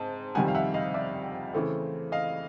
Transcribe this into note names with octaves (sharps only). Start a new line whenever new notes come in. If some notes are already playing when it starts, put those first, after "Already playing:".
Already playing: G#2 C4 A5
F2 C3 D#3 G3 F#5 G#5
F5
E5 F#5
D#5 F5
D5 E5
C#3 E3 A3 C4
D#5 F5